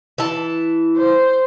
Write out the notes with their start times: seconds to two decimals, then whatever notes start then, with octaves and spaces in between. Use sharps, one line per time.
0.18 E3 A5
0.97 C5